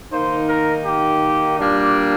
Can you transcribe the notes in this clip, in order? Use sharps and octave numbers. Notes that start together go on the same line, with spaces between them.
D#3 A#3 D#4 C5
A#4
G4
A#2 G3 A#3 D4